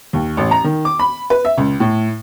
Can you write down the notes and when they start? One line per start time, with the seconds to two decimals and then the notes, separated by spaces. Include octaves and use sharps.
0.13 D#2
0.37 A1
0.51 A#5
0.64 D#3
0.85 D6
0.99 B5
1.30 B4
1.45 E5
1.58 C#2
1.80 A2